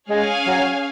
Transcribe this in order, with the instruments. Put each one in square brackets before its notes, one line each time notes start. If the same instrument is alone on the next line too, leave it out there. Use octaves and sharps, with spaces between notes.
[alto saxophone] G#3 [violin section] C#4 G#4 C#5 F5 G#5
[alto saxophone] F#3